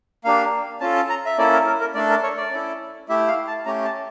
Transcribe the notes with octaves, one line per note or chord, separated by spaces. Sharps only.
A#3 D4 G4 F5
C#4 F4 A4 A5
A5
A#5
E5
A#3 C#4 E4 A4 D5
A#4
A#4
A#4
A3 D4 A4 D5
A#4
C#5
D5
C#4 E4 A4
A3 E4 G4 E5
F5
A5
A3 C#4 G4 A#5
A5